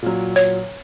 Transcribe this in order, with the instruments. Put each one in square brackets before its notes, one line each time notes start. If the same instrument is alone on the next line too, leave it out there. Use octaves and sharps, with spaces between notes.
[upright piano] A#2 F#3
[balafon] C#5